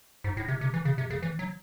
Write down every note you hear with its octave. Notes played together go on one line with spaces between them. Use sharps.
G#2
A2
C3
C3
E3
C#3
C3
C#3
E3
F#3